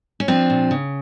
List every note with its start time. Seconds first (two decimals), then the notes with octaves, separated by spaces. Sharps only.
0.20 C#4
0.28 F3 C4 D4
0.50 A#2
0.71 C#3